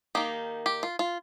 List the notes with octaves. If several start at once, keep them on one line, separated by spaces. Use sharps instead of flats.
D#3 A#3 D#4 G4
G4
F4
F4